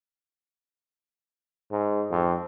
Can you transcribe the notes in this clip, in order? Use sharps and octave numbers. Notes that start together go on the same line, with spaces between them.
G#2
F2